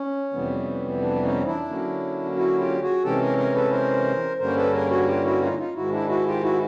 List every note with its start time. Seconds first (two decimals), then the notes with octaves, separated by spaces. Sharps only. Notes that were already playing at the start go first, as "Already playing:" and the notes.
Already playing: C#4
0.33 F2 C3 E3 G3 B3
1.02 D4
1.23 C#4 D#4
1.46 D4 E4
1.69 D3 F#3 A#3 C#4
2.36 E4 F#4
2.59 F4 G4
2.82 F#4 G#4
3.04 C3 E3 G#3 C#4 G4 A4
3.21 G#4 A#4
3.38 G#4 A#4
3.55 A4 B4
3.72 A#4 C5
4.39 G2 D3 G3 A#3 C#4 A#4 C5
4.56 A4 B4
4.73 G#4 A#4
4.90 F#4 G#4
5.08 F4 G4
5.25 E4 F#4
5.42 D#4 F4
5.58 D#4 F4
5.75 G#2 D#3 G#3 E4 F#4
5.92 D4 E4
6.09 E4 F#4
6.27 F4 G4
6.43 E4 F#4